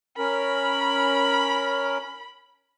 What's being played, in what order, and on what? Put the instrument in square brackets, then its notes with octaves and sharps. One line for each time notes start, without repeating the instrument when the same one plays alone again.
[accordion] C#4 A#4 [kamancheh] B5